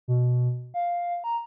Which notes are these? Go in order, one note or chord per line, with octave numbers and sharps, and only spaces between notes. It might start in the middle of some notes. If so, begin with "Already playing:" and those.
B2
F5
A#5